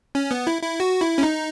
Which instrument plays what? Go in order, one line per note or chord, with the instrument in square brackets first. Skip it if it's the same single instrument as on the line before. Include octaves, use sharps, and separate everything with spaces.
[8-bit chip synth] C#4
B3
E4
E4
F#4
E4
C#4
D#4